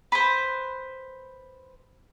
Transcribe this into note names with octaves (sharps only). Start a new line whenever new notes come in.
B4 C5